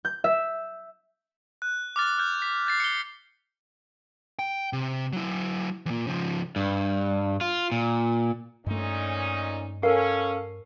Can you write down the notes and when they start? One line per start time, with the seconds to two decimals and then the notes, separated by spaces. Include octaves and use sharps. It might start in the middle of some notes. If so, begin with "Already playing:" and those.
0.05 G6
0.24 E5
1.62 F#6
1.96 D6 F6 A6
2.18 F6 G6
2.42 B6
2.67 G6 A6 C7
2.80 C#7 G7
4.39 G5
4.73 C3
5.13 F#3 E4
5.86 E2 A#2
6.07 C#3 F3
6.56 G2
7.41 F4
7.72 A#2
8.66 G2 A#2 A3 C#4 D#4
9.83 C#4 A4 A#4 F5